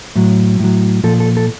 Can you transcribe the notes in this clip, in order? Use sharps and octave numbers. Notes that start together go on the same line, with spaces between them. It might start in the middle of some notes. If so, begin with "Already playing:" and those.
A2 F#3
A2 F#3
A#2 F3 A4
A4
A4